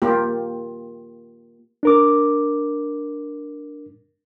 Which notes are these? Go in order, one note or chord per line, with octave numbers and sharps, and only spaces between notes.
A#3 F4 G4
D4 A#4 D6